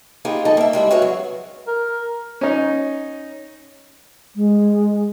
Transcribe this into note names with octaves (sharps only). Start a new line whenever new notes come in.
A#3 D#4 F4 G4 G#4 B4
G3 A3 D#4 A4 D#5
A#3 E5
G3 G#3 D4 E4
F#4 G#4 B4 C#5 E5 F5
F#3
A#4
C#4 D#4
G#3